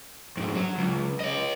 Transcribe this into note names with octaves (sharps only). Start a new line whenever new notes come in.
F2 G#2
F#3
C#2
C#5 D#5